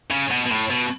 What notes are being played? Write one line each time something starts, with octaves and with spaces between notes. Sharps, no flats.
C#3
B2
B2
A2
B2